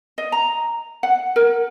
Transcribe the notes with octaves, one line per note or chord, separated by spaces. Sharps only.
D#5
A#5
F#5
A#4